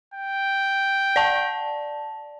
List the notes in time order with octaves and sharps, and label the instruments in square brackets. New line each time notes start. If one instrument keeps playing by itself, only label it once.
[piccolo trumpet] G5
[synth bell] D5 A5